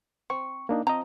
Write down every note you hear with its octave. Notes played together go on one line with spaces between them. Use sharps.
C4 C#6
A#3 D4 D#4
F3 C4 D#5 A#5